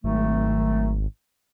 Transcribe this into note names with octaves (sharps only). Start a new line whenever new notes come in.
G#1 D#3 F#3 A3